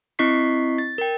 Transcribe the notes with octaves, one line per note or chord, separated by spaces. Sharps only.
C4 E4 D#5 C#6 B6 C7
A6
A#4 G5